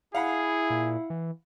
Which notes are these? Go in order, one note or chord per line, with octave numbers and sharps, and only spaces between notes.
E4 G#4 F5 F#5 B5
A#2
E3